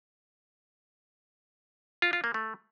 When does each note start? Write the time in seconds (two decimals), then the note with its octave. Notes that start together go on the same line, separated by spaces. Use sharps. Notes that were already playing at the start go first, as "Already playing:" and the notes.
2.02 F4
2.13 F4
2.24 A#3
2.34 A3